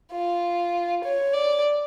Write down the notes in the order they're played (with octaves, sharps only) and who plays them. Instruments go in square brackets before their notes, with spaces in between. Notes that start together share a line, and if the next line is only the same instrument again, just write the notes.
[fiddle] F4
C#5
D5